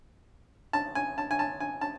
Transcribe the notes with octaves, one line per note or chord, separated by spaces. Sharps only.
A5
G#5
A5
G#5
A5
G#5
A5